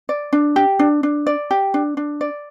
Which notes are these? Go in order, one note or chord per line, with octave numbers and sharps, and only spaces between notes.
D5
D4
G4
D4
D4
D5
G4
D4
D4
D5